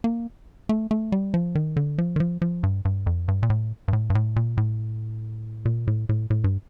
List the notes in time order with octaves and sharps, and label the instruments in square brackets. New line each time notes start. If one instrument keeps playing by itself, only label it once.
[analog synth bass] A#3
A3
A3
G3
F3
D#3
D3
F3
D#3
F3
F3
G2
G2
F2
G2
A#2
A2
G2
A2
G2
A2
A#2
A2
A#2
A2
A2
A2
G2